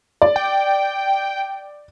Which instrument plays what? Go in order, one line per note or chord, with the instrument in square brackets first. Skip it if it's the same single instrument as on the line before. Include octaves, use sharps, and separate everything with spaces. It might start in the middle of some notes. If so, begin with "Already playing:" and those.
[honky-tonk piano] D5
[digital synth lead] G5